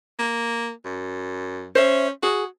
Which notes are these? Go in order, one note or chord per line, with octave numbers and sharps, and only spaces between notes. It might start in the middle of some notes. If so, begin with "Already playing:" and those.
A#3
F#2
C#4 C5 E5
F#4 G#4